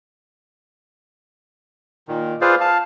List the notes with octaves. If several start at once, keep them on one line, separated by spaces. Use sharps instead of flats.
A#2 D#3
F4 G#4 B4 C5 D5 F5
F5 A5